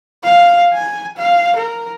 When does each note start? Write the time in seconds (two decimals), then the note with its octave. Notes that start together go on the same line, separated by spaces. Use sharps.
0.24 F5
0.74 G#5
1.17 F5
1.56 A#4